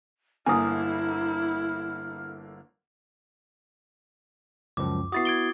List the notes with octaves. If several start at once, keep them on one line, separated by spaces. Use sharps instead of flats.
G1 D3 A#3 E4 G#5 D#6 F6
C#2 F#2 F3 D6
B3 E4 F#4 D#6 A6 C7
G#6 D7 G7